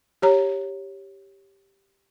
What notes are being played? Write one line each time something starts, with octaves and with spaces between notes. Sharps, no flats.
G4 C#5 A#5